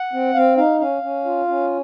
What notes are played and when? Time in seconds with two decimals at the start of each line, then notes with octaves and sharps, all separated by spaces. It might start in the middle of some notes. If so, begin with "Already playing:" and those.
Already playing: F#5
0.13 C4
0.34 C4 F5
0.57 D#4 F5
0.80 C#4 F5
1.02 C#4
1.25 F4
1.48 C#4